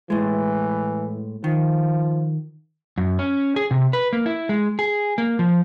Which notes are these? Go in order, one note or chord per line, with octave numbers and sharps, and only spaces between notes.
A2 E3 G#3
D#3 F3
F#2
C#4
G#4
C3
B4
A#3
E4
G#3
G#4
A#3
F3